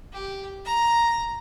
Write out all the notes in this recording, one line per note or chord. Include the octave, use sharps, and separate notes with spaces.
G4
A#5